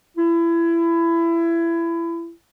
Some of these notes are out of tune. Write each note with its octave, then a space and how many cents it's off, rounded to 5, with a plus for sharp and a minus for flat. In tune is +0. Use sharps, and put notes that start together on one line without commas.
E4 +25